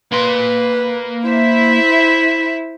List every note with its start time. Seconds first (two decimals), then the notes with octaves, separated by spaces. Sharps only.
0.12 A#3 B4 C6
1.25 E4 C5 E5